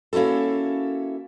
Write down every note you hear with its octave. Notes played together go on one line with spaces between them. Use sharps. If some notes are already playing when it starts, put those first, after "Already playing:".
A#3 C#4 E4 F#4 A4